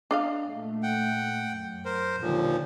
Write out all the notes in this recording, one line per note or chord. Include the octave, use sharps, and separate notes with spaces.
D4 D#5 F5
A#2 A3
F#5 G5
F#2
A#4 C5
D#2 A#2 D3 F3 G3